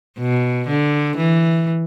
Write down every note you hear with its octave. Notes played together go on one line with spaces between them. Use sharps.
B2
D3
E3